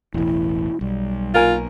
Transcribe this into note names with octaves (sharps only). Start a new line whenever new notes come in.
E1 A1 E4
B1 G3
A#3 F4 A#4 G#5